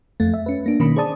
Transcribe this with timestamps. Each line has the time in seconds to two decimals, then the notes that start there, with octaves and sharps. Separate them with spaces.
0.20 F2 A3
0.34 E5
0.46 C#4 B4
0.66 A#3 D4
0.80 B2 D#3 A#3 C#4 B5
0.96 G#4 C5 D5 A5 D#6